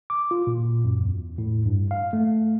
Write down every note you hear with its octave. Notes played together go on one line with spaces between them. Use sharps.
D6
F4
A#2
F#2
E2
A2
G2
F5
A3